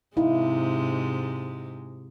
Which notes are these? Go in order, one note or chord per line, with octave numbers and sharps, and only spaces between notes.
G#2 C3 G#3 D#4 E4 F5